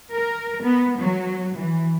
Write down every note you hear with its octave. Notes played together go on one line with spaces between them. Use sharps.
A#4
B3
F#3
E3